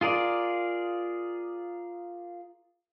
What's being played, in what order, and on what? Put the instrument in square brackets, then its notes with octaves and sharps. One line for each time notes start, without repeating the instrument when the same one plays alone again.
[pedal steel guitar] F4 G#4 A#4 D5